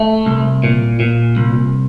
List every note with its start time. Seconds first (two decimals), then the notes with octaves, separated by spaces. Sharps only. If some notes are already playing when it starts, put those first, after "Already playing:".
Already playing: A3
0.26 C2
0.64 A#2
1.00 A#2
1.37 C2